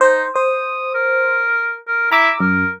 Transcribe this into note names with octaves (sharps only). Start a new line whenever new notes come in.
D#4 C5
C5 D#6
A#4
A#4
E4 A#5 D6 E6
F#2 A#4